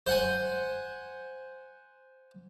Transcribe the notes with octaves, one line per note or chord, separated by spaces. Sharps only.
C5 F#5 G#5